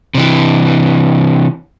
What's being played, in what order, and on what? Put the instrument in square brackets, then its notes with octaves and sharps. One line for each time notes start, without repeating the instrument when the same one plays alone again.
[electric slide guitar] C3 E3